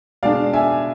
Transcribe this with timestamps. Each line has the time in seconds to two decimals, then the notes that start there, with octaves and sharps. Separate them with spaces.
0.23 B2 G#3 D4 D5 F5
0.53 E5 G#5